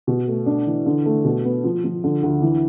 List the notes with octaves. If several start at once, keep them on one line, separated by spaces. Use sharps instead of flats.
B2
A3
D4
E3
D3
A3
B2
B3
F3
F3
D3
D2
E3